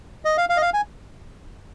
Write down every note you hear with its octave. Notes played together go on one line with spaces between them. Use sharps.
D#5
F5
F5
D#5
F5
G#5